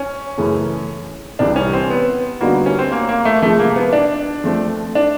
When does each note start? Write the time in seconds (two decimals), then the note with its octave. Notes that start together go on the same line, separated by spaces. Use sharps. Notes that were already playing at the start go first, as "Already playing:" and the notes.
Already playing: C#4
0.37 F#2 C#3 E3 A3
1.39 C2 C3 E3 G3 D4
1.56 C#4
1.73 C4
1.90 B3
2.41 D3 G3 A#3 B3 D#4 F#4
2.66 C#4
2.79 C4
2.92 A#3
3.09 A#3
3.25 A3
3.42 C3 F3 G#3 A3
3.59 A#3
3.76 B3
3.93 D4
4.44 F3 A3 C4
4.95 D4